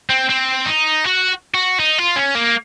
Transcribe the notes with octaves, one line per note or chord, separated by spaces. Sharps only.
C4
C4
D#4
F#4
F#4
D#4
F4
C#4
A#3